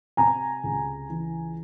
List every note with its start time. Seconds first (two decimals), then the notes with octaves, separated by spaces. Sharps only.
0.17 C3 G#5 A#5
0.64 C#2
1.10 E3